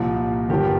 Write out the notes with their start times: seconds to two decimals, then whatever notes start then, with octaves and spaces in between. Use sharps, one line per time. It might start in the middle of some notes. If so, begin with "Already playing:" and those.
Already playing: C2 A#2 F3
0.49 G1 G2 F3 G4 A#4